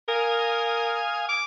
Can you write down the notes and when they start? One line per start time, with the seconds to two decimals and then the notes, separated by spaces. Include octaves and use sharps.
0.08 A#4 F5 G#5 D#6
1.29 D6